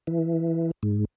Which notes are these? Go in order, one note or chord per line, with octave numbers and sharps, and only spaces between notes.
E3
G#2